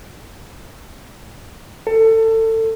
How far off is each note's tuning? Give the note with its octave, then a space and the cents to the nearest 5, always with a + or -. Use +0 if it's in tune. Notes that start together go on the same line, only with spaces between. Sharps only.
A4 +25